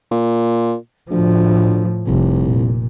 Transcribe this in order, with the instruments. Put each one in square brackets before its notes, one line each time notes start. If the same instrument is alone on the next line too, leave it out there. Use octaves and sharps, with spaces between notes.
[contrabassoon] A#2
[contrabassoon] D2 [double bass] A2 F3
[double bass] F1 [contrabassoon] C2
[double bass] A#2